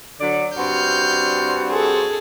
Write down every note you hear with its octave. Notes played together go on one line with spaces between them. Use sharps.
D3 F#3 D5
G2 C4 F#4 F6 G6
G#4 A4